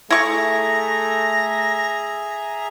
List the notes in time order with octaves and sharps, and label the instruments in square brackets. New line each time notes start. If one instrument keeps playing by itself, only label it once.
[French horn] A3 [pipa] E4 C#6 [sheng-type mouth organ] G#4 E5 A#5 [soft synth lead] A#6